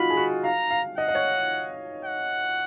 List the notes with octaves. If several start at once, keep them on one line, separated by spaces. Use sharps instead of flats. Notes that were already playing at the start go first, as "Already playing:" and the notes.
Already playing: D#4 F4 F#4 B5
G#4
F#4
F5 A#5
F5
D#5 F#5
D#5
C#5
F#5